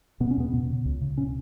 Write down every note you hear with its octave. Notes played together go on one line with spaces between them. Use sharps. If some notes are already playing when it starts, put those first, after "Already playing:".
B2 B3
C#4
E2 B3
B2
C#3
C#2
C#3
B2 C#4